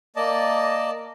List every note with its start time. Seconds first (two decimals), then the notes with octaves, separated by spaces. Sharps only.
0.16 A#3 D5 D#5 A5